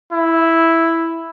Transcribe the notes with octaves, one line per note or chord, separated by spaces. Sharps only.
E4